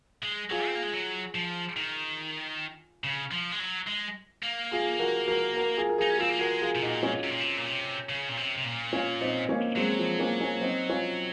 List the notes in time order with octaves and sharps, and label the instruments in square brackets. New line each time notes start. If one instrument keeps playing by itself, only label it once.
[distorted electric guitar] G#3
[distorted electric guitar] F#3 [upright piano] F4 G#4
[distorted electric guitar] C4
A#3
G#3
F#3
F3
D#3
C#3
F3
G#3
F#3
G#3
A#3
[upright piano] F4 G#4
F#4 A#4
F#4 A#4
F#4 A#4
F4 G#4
A#4
[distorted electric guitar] D#4 [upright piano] F4 G#4
[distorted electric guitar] C#4
[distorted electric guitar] C4 [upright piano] F4 G#4
[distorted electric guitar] A#3
[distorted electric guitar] G#3 [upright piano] F#4 A#4
[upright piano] F4 G#4
[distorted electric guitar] C3
[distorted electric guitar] A#2 [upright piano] D#4 F#4
[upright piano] C#4 F4
[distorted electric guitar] C3
A#2
C3
A#2
C3
C#3
A#2
C3
C3
A#2
[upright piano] C#4 F4
C4 D#4
A#3 C#4
[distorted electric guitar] F#3 [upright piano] G#3 C4
[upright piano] F3
A#3 C#4
A#3 C#4
C4 D#4
C#4 F4